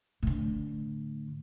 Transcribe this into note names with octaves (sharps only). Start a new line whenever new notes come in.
A2 D3